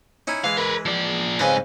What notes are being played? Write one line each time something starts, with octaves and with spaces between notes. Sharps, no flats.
C#4 D#4 E4
E3 G#3 F5
A#4 B4
F3 D5
F2 G#2 C#3 B4 G#5